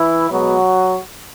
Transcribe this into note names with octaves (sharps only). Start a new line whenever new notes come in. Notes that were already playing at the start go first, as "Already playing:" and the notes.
Already playing: E3 E4
B2 F#3 G#3 B3 F#4